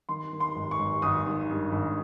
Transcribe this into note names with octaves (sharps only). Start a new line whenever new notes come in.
D#3 C6
D#3
C6
G#1
C#6
G#1
G#1 D#6
D#3
G2
G#1